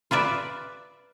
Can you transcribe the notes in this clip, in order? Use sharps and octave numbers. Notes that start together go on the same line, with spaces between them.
F4 B4 D5 E5